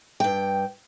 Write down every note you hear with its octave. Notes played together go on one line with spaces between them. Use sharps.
G2 G5